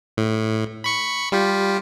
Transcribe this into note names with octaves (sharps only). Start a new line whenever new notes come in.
A2
B5 C#6 C#7
G3 F4 G4